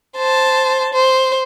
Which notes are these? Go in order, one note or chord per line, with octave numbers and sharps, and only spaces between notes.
C5 A5
C5